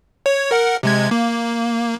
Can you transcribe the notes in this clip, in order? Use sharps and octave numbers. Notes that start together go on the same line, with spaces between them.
C#5
A#4 F#5
C3 G#3 G#6
A#3